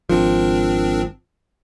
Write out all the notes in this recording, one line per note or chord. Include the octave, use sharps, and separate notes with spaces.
G#1 F3 C4 D4 A#4